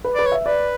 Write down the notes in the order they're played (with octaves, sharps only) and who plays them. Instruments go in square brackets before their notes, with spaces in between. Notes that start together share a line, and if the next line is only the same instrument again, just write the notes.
[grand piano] B4
[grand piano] B4 [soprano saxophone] D5
[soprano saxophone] C#5
[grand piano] E5
[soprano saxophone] B4 [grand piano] D5